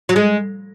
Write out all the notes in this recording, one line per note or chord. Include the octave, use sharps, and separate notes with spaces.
F#3
G#3